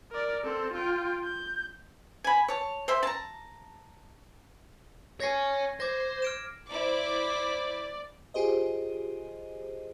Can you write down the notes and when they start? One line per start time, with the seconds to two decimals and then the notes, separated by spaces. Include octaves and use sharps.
0.11 A#4 D5
0.44 C4 A4
0.74 F4 G5
1.24 G6
2.24 G#5 B5
2.48 C#5 A5
2.88 C5 E5 C6
3.03 A5 A#5
5.20 C#5 G#5 G#6 A#6 C7
5.80 C5 D6 G#6 A#6
6.22 F6 D7 E7
6.70 E4 C5 D5 D6
8.34 F4 G4 G#4 C5 D#5